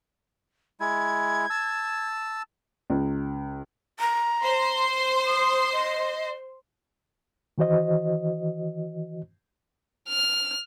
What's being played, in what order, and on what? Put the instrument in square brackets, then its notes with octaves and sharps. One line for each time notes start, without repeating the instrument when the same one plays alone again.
[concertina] G#3 E4 [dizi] G#6
[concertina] A5 E6
[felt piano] C#2
[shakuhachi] A#5
[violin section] C5 C6
[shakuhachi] D#6
D#5
[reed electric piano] D#3 E3 F#4 C5 D#5
[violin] F6